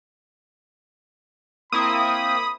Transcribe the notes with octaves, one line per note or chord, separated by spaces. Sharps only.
A#3 C4 E4 B5 D#6